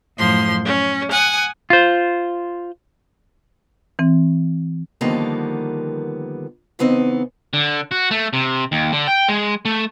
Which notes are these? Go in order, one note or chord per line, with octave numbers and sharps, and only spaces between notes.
F#2 A2 F3 C6
C#4
F#5 G#5 D#6
F4 C5
E3 C4
D3 D#3 F3 G3 A#3 B3
C#3 E3 B3 C4 D#4
D3
F#4
A3
C3
D#2
D3
G5
G#3
A3